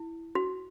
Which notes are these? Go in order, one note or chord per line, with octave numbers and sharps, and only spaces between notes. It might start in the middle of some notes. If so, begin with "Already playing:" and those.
Already playing: E4
F#4